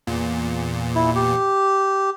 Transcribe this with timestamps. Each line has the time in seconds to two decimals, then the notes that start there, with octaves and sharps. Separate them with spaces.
0.07 E2 A#2
0.95 E4
1.15 G4